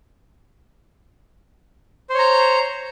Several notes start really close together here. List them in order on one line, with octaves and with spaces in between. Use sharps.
C5 C#5 A#5